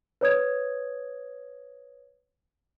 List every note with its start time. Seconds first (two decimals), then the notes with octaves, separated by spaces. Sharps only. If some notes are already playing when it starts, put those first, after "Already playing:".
0.21 B4 C#5 D#6 G#6